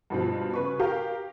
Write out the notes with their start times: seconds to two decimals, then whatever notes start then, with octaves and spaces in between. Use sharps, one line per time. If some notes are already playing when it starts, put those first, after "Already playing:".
0.10 G2 B2 F3
0.54 C#3 B4 C#6
0.79 G4 A#4 F5